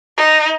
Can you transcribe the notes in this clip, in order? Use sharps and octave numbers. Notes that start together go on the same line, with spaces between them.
D#4